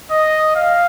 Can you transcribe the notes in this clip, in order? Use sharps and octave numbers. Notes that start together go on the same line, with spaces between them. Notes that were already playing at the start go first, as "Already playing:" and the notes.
D#5
F5